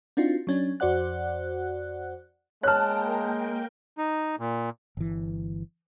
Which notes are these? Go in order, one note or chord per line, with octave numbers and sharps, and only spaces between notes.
C4 D4 D#4 F4 F#4
F#3 C#4 D4
F2 F#4 C5 D5 F#5 F#6
G#3 A#3 A#4 C#5 G5 A5 F6 F#6
D#4
A#2
G1 E3